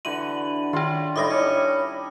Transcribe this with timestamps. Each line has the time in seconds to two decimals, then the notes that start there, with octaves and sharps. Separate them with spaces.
0.05 D3 E3 F#4 D#7 F#7
0.73 D#3 C#4 D4 F4
1.16 A2 D#3 G3 E4 D6 D#6 A#6
1.30 C#4 D4